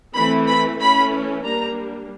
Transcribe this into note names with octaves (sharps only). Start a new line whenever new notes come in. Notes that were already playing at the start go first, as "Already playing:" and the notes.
E3 A3 C4 B5
B5
E3 A3 C#4 B5
G3 A#3 D4 A#5